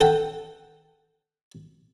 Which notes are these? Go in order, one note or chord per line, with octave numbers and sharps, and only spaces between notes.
A4 F#5 G5